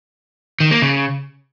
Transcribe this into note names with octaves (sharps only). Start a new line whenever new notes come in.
D#3
A#3
C#3